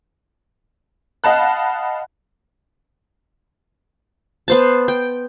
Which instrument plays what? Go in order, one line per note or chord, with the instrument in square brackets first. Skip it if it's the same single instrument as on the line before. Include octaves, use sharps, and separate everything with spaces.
[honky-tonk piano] D#5 F5 F#5 A5 B5 F#6
[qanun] B3 C5 A5
G5